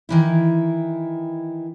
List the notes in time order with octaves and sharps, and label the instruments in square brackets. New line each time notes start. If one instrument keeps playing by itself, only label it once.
[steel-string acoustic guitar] D#3 E3 E4